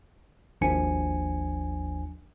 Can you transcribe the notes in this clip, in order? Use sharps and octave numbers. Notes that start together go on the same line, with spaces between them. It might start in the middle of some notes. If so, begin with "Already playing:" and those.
G#1 D#2 F3 D4 G#5 C#7